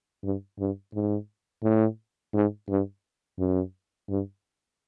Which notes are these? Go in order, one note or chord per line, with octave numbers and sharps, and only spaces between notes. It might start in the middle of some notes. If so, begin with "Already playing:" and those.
G2
G2
G#2
A2
G#2
G2
F#2
G2